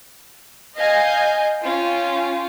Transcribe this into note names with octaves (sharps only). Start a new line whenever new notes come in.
D#5 F5 G#5 G6 G#6
C#4 F4 G5